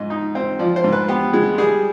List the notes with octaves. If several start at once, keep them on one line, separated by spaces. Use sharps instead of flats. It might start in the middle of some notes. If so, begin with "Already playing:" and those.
Already playing: G#2 D#5
D#4
C4
F3 D5
C5
G#2
B4
B3 G4
G#3
G3 G#4